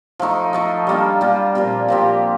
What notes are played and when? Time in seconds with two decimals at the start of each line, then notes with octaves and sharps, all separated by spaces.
0.19 F3 A3 D#4
0.53 F3 A3 D#4
0.87 G3 A#3 D4 F4
1.21 G3 A#3 D4 F4
1.55 A#2 F3 C4 G4
1.88 A#2 F3 C4 G4